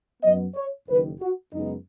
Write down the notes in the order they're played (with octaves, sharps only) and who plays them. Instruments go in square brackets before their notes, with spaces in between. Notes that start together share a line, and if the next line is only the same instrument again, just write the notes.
[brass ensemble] F#2 F#3 B3 D#5
C#5
F#1 F#2 D#3 B4
F#4
F#2 C#3 G#3 B3 D#4